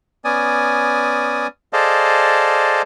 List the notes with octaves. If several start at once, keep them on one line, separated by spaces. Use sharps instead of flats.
B3 C#4 D5 G#5 D#6
G#4 A4 C5 D5 D#5 F5